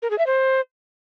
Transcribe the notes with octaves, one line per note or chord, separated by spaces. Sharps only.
A#4
G#4
E5
C5